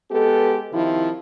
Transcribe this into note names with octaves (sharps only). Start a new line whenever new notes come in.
G#3 B3 G4 A4
C3 D#3 F3 E4